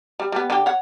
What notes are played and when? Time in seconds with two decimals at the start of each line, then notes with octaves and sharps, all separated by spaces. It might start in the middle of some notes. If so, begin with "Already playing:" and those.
0.20 G3
0.32 G3 B3
0.50 D3 G4
0.66 C#5 F#5